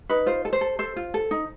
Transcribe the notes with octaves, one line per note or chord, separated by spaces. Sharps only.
D#4 B4
F4 C5
A4
C5
A4
A4 C5
F4
A4
D#4